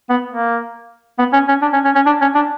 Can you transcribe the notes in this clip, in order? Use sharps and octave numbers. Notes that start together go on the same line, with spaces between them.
B3
A#3
B3
C#4
C#4
D4
C#4
C#4
C#4
D4
C#4
D4